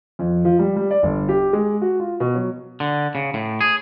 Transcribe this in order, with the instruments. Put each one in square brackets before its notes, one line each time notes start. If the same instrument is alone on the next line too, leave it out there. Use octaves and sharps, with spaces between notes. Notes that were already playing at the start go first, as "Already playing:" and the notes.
[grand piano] F2
F3
G3
G3
D5
G1
G4
G#3
F#4
F4
B2
F#3
[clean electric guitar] D3
C#3
A2
G#4